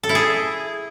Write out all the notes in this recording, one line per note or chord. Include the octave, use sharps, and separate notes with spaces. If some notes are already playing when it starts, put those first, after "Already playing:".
A4
E4
G#4